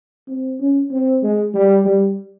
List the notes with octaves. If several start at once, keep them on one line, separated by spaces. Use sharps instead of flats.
C4
C#4
C4
G#3
G3
G3